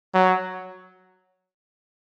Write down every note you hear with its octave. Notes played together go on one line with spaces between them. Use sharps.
F#3